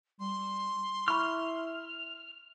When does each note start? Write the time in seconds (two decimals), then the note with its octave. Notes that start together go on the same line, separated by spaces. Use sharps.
0.20 G3 C6
1.08 E4 B5 C#6 F6